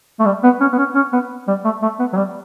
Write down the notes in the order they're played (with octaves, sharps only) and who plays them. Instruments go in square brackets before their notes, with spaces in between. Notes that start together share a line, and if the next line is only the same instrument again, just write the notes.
[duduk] A3
G3
B3
C#4
B3
C#4
C#4
B3
G3
A3
A3
B3
F#3
G3